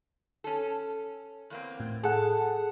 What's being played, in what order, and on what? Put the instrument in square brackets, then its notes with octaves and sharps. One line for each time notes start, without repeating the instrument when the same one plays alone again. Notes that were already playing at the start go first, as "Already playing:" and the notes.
[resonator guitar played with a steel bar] C#4 A4
E2 A#3 C4
[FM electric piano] A2
[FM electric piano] G#4 F#5 [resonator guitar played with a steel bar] A4